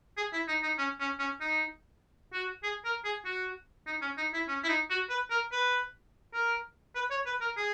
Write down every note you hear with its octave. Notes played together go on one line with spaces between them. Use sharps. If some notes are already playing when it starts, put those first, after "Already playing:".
G#4
E4
D#4
D#4
C#4
C#4
C#4
D#4
F#4
G#4
A#4
G#4
F#4
D#4
C#4
D#4
E4
C#4
E4
D#4
F#4
B4
A#4
B4
A#4
B4
C#5
B4
A#4
G#4